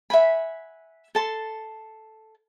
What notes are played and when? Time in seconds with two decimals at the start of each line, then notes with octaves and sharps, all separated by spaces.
0.10 E5 F#5 G#5 B5
1.15 A4 A5 C6